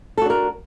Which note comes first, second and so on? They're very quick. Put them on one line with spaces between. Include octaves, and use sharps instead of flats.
A4 F#4 D4 A#4